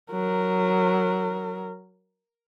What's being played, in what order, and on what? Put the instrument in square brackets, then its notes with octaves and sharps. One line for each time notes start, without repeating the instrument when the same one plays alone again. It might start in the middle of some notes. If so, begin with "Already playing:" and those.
[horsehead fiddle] F#3 A#4